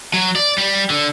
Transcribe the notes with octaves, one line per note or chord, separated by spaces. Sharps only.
F#3
D5
G3
D3